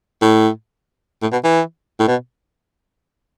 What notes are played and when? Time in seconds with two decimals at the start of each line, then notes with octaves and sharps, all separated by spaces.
0.22 A2
1.22 A2
1.32 B2
1.44 E3
2.00 A2
2.08 B2